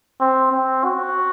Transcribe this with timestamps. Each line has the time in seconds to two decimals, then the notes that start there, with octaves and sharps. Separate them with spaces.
0.21 C4
0.52 C4
0.84 F#4